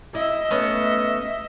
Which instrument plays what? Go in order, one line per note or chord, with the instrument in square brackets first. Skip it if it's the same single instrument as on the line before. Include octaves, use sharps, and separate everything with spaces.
[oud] E4 [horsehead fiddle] D#5 E5
[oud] A3 B3 C#4